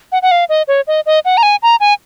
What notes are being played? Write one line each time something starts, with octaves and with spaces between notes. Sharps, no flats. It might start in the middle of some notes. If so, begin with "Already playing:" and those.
F#5
F#5
F5
D#5
C#5
D#5
D#5
F#5
A#5
G#5
A#5
G#5